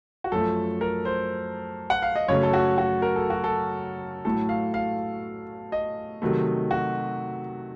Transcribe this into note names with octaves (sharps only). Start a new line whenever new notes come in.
F#4
F#2 F3 A3 A4
A#4
C5
F#5
F5
D#5
F#2 C#3 F#3 A3 C#5
A4
F#4
F#4
A#4
A4
F#4
A4
A2 F#3 A3 A4
F5
F5
D#5
C3 D#3 F#3 A3
F#4